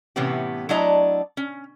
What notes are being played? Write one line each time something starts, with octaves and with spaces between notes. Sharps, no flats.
A2 C3 E3 B3 C#4 G4
F#3 A3 D4 E4 D#5 A#5
C#4